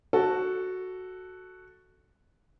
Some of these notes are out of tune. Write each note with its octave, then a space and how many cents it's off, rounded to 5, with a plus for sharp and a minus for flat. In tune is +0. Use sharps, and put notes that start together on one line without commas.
F#4 +0 A4 +0